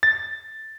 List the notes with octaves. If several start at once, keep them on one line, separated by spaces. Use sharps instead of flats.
A6